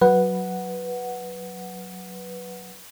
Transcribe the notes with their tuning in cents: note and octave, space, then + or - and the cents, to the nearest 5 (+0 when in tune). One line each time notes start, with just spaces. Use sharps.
F#3 +0 B4 +0 F#5 +0